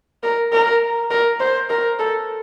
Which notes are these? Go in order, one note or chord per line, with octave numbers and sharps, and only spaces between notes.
A#4
A#4
A#4
C5
A#4
A4